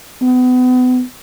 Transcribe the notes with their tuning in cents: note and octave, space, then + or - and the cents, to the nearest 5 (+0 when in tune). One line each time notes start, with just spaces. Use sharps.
B3 +35